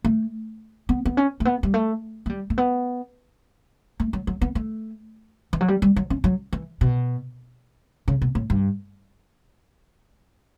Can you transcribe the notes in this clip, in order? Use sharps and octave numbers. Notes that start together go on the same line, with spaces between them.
A3
B3
B3
C#4
A3
B3
G3
A3
A3
G3
A3
B3
A3
F#3
F#3
B3
A3
E3
F#3
G3
G3
F#3
C#4
F#3
E3
B2
C#3
B2
A2
G2